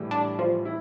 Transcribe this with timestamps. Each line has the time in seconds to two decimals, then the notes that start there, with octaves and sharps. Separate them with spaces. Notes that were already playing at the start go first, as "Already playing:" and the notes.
Already playing: A2 E3 G3
0.11 D4
0.39 F3
0.65 E4